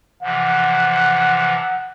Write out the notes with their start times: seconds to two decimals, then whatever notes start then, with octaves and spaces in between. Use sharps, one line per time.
0.23 C3 E3 F3 F#5